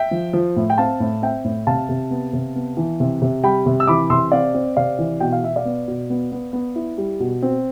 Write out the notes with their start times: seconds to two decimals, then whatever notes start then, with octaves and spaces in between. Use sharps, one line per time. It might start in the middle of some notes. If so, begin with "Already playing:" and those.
Already playing: E5 G5
0.11 F3
0.33 F3
0.56 A2
0.70 G5
0.78 C4 F5 A5
1.00 A2
1.22 C4 E5 G5
1.45 A2
1.67 C3 F5 A5
1.89 C3
2.11 B3
2.33 C3
2.56 B3
2.77 E3
3.00 C3
3.22 C3
3.44 G3 G5 B5
3.66 C3
3.80 E6
3.87 E3 B5 D6
4.10 C3 C6 E6
4.32 C4 D5 F5
4.54 C4
4.77 C3 D5 F5
4.99 E3
5.20 B2 G5
5.32 F5
5.43 B2 E5
5.56 D5 F5
5.65 B3
5.88 B2
6.10 B3
6.32 B3
6.53 B3
6.76 E4
6.98 G3
7.20 B2
7.43 C4